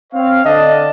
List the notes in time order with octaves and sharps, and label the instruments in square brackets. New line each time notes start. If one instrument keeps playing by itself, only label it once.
[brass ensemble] C4 C#5 F5
[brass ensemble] D3 D4 A5 [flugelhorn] D#5